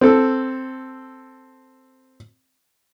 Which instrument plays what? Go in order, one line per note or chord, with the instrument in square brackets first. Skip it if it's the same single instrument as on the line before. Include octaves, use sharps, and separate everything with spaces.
[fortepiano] C4 A4